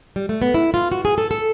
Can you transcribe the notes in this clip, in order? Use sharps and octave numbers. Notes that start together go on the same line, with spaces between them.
G3
A3
B3
E4
F4
F#4
G#4
A4
A4